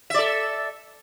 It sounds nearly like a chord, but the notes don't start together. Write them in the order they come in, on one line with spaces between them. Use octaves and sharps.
E5 D5 A4